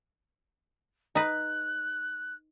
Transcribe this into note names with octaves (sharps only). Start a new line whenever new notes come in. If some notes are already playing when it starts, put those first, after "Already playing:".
D#4 B4 F#6